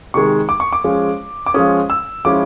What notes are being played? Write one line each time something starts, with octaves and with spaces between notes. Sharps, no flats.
C3 D#3 G#3 C#6
D6
C#6
D6
F3 G#3 C#4
D6
F3 G#3 C#4 D#6
E6
F3 G#3 C#4 E4 D6